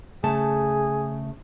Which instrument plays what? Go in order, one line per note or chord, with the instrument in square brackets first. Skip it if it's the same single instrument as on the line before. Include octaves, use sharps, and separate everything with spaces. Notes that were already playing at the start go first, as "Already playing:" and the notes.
[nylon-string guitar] C#3 A3 A5 [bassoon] G#4